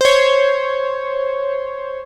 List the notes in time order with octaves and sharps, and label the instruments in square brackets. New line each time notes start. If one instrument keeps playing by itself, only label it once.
[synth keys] C5 C#5